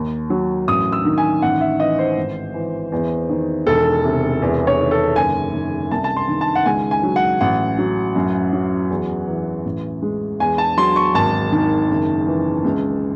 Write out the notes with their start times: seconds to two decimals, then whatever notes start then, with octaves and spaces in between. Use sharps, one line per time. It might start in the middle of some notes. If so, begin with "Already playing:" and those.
Already playing: D#2
0.30 F#3
0.68 A1 D#6
0.92 E6
1.05 D#3
1.18 G#5
1.42 A1 F#5
1.61 E5
1.80 E3 D#5
1.99 C5
2.18 G#1
2.54 E3
2.92 E2
3.29 D#3
3.67 E1 A4
4.04 C3
4.42 E2
4.67 C#5
4.79 D#3
4.91 A4
5.16 F#1 G#5
5.54 D#3
5.91 C2 A5
6.04 A5
6.17 C6
6.29 D#3
6.41 A5
6.55 F#5
6.66 C#2 G#5
6.91 G#5
7.03 F#3
7.16 F#5
7.41 A1 F#5
7.78 F#3
8.15 F#2
8.53 F#3
8.90 E2
9.27 E3
9.65 A1
10.02 G#3
10.40 E2 G#5
10.58 A5
10.77 F#3 C6
10.96 C#6
11.14 G#1 A5
11.52 D#3
11.90 F#1
12.27 E3
12.64 C#2